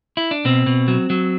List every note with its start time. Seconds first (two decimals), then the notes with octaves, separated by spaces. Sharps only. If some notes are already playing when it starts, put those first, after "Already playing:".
0.17 E4
0.31 D4
0.45 B2 C4
0.66 B2
0.88 F#3
1.10 F#3